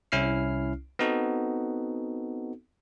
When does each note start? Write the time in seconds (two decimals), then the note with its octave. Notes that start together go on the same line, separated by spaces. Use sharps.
0.12 C2 C#4 E4 F6 C7
0.99 B3 C4 D#4 F#4 A4